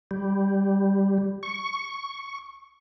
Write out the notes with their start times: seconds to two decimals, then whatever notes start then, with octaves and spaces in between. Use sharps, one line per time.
0.11 G3
1.43 C#6